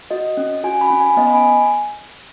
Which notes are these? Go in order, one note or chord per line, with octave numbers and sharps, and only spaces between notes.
F#4 D#5
C#4
F#4 G#5
B5
C#4
G#5
B3 D#5
B5
G#5